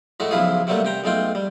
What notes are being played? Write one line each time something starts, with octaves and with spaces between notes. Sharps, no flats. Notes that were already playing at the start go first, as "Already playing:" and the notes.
A2 G#3 A3 F#4
B1 C#3 F3 E4 F4 G#4
C3 F#3 G3 A3 A#3 A4
C3 G5 A#5
B1 G#3 A3 F4 G5
G3